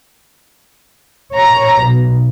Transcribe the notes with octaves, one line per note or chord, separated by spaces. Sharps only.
C#5 A#5
B1